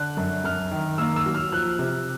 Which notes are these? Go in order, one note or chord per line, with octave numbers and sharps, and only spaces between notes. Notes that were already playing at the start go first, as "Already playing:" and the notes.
Already playing: D3 F#6
F#2
F#2 F6
D#3
A#3 E6
E6
F#3
F6
F3 F#6
C3